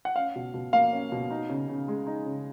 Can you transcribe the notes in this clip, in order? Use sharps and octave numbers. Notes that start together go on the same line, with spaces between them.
F#5
C#4 F5
B2
B2
A#3 F5
C#4
B2
D#4
C#3
C#3
G#3
D#4
C#3